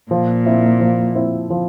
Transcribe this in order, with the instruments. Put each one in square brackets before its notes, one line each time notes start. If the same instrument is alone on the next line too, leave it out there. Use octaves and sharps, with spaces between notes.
[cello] A#2 [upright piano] F3
[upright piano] C4 E4
F3
C4 E4
F3